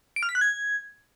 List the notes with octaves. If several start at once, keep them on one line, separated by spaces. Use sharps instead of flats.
D7
F6
B6
F#6
G#6